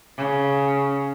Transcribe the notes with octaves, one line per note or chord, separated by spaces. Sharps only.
C#3